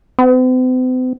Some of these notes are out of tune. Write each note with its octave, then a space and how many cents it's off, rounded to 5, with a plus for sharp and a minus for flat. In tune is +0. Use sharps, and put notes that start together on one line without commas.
C4 -45